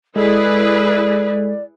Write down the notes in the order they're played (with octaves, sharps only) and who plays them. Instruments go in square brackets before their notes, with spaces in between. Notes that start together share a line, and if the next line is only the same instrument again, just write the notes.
[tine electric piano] G#3 A4 [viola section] E4 G#4 B4 [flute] D5